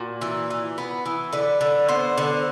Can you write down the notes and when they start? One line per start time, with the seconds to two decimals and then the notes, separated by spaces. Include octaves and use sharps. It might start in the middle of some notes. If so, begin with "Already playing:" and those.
Already playing: A#2 F#4
0.21 E3
0.50 E3
0.78 B3
1.06 E3
1.33 D3 B4
1.61 D3
1.89 B3 C5
2.18 D3